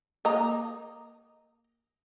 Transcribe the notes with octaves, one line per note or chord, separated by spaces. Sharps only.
A#3 D#5 A#5